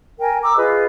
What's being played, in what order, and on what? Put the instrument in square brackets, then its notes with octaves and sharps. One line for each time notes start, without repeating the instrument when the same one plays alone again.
[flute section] A#4 G5 G#5
A#5 D6 E6
F4 G#4 B4 D#5